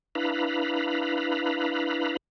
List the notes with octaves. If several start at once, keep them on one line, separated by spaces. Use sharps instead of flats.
D4 E4 B4 F5 A#5 B5